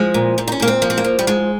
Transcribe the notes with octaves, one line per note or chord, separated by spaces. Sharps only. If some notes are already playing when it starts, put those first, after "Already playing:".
Already playing: F3 G#3
A#2
A#2
D#4
C#4
A#2 A#3
C4
F3 A#3
C4
A#3
F3
G3
G#2 G#3